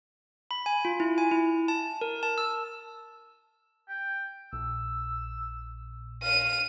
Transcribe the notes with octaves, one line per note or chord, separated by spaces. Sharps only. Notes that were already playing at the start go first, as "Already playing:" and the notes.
B5
G#5
F4
E4
G#5
E4
A5
A#4
A5
E6
G5
A#1 A#2 E6
F5 D#7